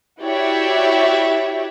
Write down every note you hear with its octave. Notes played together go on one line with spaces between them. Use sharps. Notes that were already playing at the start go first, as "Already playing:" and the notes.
E4 F#4 G4 C#5 D5 E5